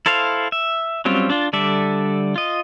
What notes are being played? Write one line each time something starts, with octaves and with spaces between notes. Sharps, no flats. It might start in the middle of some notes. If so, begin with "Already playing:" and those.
E4 A4 C5 F5
E5
F#3 G3 C4 C#4 F4
D4 F4
D3 G3 A4 D5 E5
F4 D#5